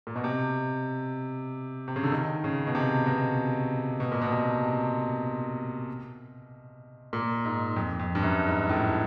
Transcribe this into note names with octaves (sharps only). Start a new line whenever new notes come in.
A#2
B2
C3
C3
C#3
D3
D#3
C#3
B2
C3
B2
B2
A#2
B2
C3
C3
A#2
G#2
F2
F2
G2
F#2
G#2
A2